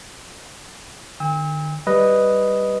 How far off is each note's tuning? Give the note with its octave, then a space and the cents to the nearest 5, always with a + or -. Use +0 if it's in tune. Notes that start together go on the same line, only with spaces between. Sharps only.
D#3 -45 G5 +45 E6 -35
G3 +0 B4 +0 D#5 +0